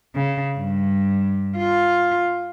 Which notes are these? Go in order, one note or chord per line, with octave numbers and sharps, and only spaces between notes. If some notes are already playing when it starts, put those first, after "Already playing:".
C#3
G2
F4